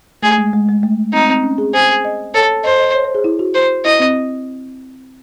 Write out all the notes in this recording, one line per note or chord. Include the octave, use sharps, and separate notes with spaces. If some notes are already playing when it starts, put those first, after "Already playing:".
A3 G#4
G#3
G#3
G#3
A3
C4 D#4
C4
C#4
G#4
G#4 C5
D#5
A4 C#5
C5 D#5
D#5
C#5
C5
G#4
E4
F#4
C5
E4 D#5
C4